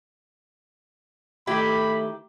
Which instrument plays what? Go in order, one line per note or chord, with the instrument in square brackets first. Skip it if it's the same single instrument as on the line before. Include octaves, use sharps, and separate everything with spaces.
[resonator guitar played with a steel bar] D#3 E4 G4 [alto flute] A3 [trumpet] B5